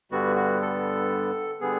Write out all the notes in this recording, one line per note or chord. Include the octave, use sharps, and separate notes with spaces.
G2 D3 G3 B3 F#4
F#4
A4
D3 G3 B3 G#4